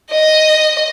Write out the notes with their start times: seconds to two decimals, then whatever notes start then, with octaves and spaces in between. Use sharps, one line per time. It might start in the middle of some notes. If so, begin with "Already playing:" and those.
0.11 D#5